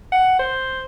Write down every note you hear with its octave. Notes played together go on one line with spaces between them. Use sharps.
F#5
C5